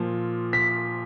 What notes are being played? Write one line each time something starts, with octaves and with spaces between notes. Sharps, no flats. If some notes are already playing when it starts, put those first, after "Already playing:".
Already playing: A#2 F3
B6